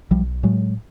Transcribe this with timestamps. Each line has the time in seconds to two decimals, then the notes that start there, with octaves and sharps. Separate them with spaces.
0.11 B1 F3 G3
0.43 A2 F#3 G#3